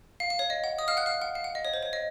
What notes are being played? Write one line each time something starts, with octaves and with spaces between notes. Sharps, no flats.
F5
F5
C#5
D#5
F#5
D#5 D#6
F5 F6
F#5 F#6
F5 F6
F#5
F5
F#5
D#5
C#5
C5
C#5
D#5